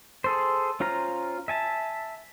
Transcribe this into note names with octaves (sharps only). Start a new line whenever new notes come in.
G#4 A4 C5
C#4 F4 C5 A#5
E5 G#5 A5